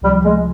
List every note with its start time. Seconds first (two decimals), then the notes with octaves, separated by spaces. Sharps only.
0.02 C#2 C3 F3 G3
0.24 G#3